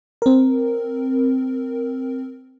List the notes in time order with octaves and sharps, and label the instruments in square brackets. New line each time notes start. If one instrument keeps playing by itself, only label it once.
[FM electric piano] C4 A#4